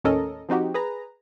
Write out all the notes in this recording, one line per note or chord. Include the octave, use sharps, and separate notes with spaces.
D#2 A2 C#4 A4 A#4 D#5
F3 C4 D#4 F#4 G4
G#4 B4 A#5